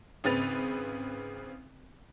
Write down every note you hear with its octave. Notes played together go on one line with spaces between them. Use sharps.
G#1 C#3 C4 B4 A6 F7